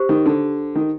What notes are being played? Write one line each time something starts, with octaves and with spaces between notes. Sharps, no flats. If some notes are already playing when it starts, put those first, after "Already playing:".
Already playing: G4 C5
D#3
D3
D#3